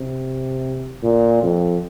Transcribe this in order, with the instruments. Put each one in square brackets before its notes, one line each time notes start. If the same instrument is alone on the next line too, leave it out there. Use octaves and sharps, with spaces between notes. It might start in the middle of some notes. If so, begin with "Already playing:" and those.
Already playing: [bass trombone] C3
A#2
F2